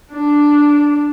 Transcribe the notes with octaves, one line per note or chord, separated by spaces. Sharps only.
D4